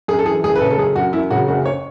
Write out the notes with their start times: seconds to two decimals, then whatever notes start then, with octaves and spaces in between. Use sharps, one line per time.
0.08 F#2 G#4
0.19 A4
0.26 E3 G#4
0.43 F#1 G#4
0.56 B4
0.60 C#3 A4
0.70 A4
0.78 F#2 G#4
0.96 F#2 F#4
1.13 F#2 E4
1.31 C#3 F#4
1.48 F#1 F#4
1.65 C#5